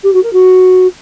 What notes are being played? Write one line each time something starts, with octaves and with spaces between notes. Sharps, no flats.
G4
F#4
A#4
F#4